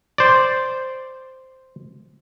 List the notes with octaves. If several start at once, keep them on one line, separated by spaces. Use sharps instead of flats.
C5 D5